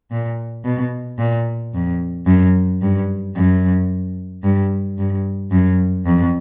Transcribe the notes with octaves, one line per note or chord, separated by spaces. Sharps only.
A#2
B2
A#2
F2
F#2
G2
F#2
G2
G2
F#2
F2